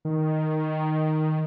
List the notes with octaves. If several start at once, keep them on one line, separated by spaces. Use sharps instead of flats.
D#3